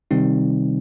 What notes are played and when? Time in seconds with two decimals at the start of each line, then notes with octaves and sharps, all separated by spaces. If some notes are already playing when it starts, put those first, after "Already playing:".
0.11 C3 D#3 G3 C4 D#4